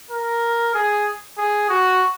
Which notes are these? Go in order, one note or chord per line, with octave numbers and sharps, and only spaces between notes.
A#4
G#4
G#4
F#4